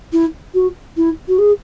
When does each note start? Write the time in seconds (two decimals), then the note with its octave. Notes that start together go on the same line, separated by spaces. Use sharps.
0.12 E4
0.54 F#4
0.96 E4
1.28 F#4
1.38 G#4